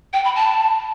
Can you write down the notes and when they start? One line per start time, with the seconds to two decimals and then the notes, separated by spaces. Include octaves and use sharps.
0.13 G5
0.24 B5
0.36 A5